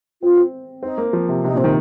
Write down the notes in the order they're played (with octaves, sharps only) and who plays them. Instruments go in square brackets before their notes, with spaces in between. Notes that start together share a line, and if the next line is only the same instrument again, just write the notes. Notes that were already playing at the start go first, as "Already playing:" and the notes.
[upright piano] C4 [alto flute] F4
[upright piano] C4
[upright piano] C4 [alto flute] D#4
[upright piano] A#3
F3
C3
[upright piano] C3 [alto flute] D#4
[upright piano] A#2 [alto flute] C4
[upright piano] D#3